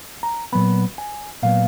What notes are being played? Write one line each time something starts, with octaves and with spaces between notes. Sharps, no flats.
A#5
A#2 F#3 B3 B5
G#5
A#2 F#3 B3 F5